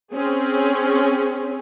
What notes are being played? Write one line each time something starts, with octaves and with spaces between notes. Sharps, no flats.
C4 C#4 G#4